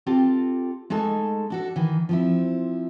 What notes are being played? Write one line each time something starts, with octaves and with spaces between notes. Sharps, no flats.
C4 F4 G4 A4
G#3 A3 D#4 A4 G#5 A5
D4 F#4 A4
D#3 E3
F3 C4 E4